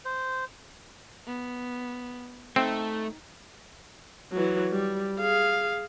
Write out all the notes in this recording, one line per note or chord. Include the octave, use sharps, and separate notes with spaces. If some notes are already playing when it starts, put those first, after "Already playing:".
C5
B3
A3 C4 D#4
E3 F#3
G3
G#4 F5